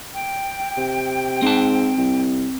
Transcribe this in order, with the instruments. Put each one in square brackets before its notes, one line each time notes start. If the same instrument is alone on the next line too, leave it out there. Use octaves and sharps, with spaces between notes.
[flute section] G5
[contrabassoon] C3
[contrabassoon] G#2 [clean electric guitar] C4 A5
[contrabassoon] C2